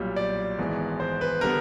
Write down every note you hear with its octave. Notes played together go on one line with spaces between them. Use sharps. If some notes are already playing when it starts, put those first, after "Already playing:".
Already playing: B1 A#2 G3
D5
G#1 G#2 E3 G#3 B3
C5
B4
D3 G3 B3 A#4